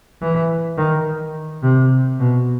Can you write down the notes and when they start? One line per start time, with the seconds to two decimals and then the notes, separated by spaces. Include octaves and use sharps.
0.22 E3
0.78 D#3
1.63 C3
2.19 B2